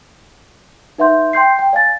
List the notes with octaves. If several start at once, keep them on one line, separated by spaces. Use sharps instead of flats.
D#4 B4 E5 F#5 C6 G6
G5 C6 G6 C7
G5
D5 F5 G#5 A6